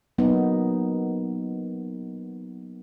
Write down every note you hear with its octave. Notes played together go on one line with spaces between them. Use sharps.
F#3 A#3 B3 D#4